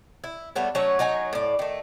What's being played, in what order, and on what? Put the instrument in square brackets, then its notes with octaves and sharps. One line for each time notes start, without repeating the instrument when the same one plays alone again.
[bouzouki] E4
G3 A3 B3 C#5
F#3 A3 C#4 C#5
F#3 D#4 C#5 G#5
A2 D5
D#3 A3